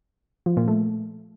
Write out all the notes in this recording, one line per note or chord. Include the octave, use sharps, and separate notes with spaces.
F3
A#2
A3